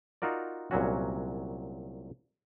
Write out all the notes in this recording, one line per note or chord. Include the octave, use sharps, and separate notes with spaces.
D#4 F4 F#4 A#4 D5
C2 A#2 F#3 C#4 F#4